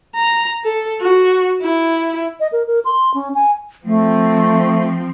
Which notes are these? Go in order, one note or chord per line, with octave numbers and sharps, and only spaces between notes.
A#5
A4
F#4
E4
D#5
A#4
A#4
C6
C#4
G#5
F3 A3 C4